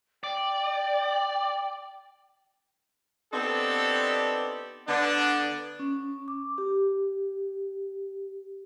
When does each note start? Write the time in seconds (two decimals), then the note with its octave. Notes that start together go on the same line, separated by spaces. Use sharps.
0.24 D5 G5
3.33 B3 C4 D4 D#4 G4 A4
4.88 D3 B3 D4
5.79 C#4
6.28 D6
6.58 G4